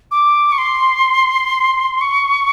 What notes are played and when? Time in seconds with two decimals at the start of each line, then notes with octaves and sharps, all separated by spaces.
0.11 D6
0.52 C#6
0.58 C6
2.01 C#6